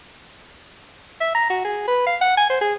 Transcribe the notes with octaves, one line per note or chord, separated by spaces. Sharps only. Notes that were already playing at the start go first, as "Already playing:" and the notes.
E5
A#5
F#4
G#4
B4
F5
F#5
G#5
C5
G#4